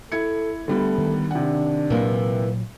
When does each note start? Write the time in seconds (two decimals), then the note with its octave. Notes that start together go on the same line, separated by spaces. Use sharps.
0.12 E4 A4 G#6 C#7
0.68 D3 G3 A3 B3
0.98 D#3
1.31 C3 D4 F#5
1.90 A#2 E3 F#3 A#3